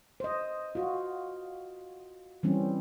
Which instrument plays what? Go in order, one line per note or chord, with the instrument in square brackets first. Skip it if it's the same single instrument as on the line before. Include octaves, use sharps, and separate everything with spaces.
[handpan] C5 D#5
F4 F#4
E3 G3 C4 C#4